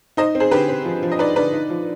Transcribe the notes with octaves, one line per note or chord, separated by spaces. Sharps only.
D#4 C5 D#5
C4
G#4 C5
D3 G4 B4
C4
F3
F3
D#5
D#4 B4 D5
D3 B4 D5
D#4
F3